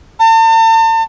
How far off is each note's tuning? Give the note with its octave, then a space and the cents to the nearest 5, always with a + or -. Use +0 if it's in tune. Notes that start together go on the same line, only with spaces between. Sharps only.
A5 +40